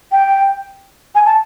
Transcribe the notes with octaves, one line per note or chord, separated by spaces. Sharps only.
G5
G#5
A5